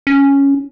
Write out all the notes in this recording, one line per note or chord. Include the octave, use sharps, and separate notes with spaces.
C#4